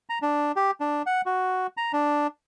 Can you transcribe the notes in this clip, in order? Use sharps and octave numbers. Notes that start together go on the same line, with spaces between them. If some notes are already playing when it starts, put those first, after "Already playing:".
A#5
D4
G4
D4
F#5
F#4
A#5
D4